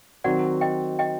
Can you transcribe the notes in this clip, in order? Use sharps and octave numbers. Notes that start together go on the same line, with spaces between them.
D#3 F#3 C4 F#4 D5 F#5
D#5 G5
D#5 G5